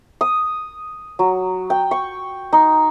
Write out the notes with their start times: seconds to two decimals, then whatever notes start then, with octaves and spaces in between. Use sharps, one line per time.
0.21 D#6
1.19 F#3
1.70 G5
1.91 C#6
2.53 D#4